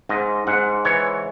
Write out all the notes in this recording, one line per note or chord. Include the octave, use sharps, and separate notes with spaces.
G#2 D#5
G#2 F#5
E3 C#5